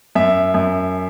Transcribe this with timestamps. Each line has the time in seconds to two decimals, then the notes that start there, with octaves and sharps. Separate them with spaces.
0.15 F#2 E5
0.54 F#2